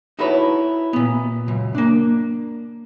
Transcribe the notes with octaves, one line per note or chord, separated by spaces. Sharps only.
D#4 E4 F#4 A4 B4 C#5
A#2 B3
C#2 F#2
A#3 D4